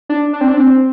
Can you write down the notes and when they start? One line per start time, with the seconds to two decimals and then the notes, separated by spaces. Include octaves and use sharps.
0.09 D4
0.33 D4
0.41 C4
0.48 D4
0.57 C4